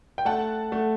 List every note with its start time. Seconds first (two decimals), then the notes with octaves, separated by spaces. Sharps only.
0.18 G5
0.25 A3 F#5 A5
0.72 A3